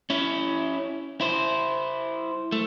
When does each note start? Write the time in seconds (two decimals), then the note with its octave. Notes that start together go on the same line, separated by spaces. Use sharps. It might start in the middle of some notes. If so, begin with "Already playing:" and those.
0.10 C#4 E4
1.21 E4 C5
2.52 A3